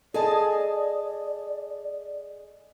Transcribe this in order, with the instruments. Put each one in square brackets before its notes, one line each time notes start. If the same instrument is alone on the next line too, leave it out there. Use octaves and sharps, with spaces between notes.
[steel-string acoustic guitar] G#4 G#5 A5 [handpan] A4 D#5 [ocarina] D5